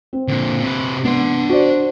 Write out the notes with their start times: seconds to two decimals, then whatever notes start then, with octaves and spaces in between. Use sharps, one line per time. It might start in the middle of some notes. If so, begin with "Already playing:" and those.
0.13 C4
0.28 A#2 D3
0.62 C3 B4
1.05 B3 D4 C6
1.49 F#4 C5 D5